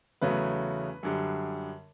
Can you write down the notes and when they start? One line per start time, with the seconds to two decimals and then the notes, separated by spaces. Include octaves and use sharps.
0.21 E2 C#3 F#3 A3 B4
1.03 F#2 D3 G3